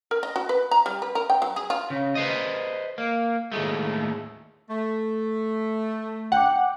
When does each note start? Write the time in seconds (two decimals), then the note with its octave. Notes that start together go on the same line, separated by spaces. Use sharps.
0.11 A#4
0.23 D#5
0.36 F#4
0.49 B4
0.71 A#5
0.86 G3
1.02 B4
1.15 A#4
1.30 G5
1.42 F#3
1.56 G#4
1.70 F4
1.90 C#3
2.15 B4 C5 D#5
2.98 A#3
3.52 D#2 A2 G#3 A3
4.69 A3
6.32 F#5 G5 D6